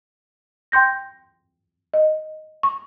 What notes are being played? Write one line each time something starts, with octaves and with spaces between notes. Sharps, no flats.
G5 C6 G6 A#6
D#5
C#6